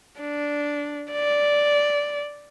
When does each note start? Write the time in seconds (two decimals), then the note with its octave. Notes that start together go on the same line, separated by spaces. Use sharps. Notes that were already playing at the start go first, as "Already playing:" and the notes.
0.20 D4
1.12 D5